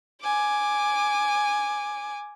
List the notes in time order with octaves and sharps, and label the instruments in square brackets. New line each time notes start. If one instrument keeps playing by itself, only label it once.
[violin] G#5 D6